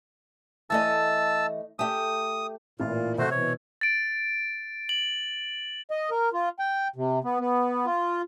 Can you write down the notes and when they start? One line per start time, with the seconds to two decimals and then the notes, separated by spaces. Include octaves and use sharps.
0.70 E3 A3 D#5 A5 E6
1.79 A3 G4 D#6
2.80 A1 A#2 E3 F4
3.18 C3 A3 F#4 C5
3.31 B2 E3 C#5
3.81 A6 D7
4.89 F#7
5.91 D#5
6.11 A#4
6.33 F4
6.59 G5
6.96 C3
7.24 B3
7.40 B3
7.86 F4